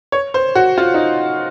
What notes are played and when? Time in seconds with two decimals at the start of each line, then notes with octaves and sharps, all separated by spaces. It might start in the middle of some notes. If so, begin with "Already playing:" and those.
0.12 C#5
0.34 C5
0.55 F#4
0.78 F4
0.94 D#4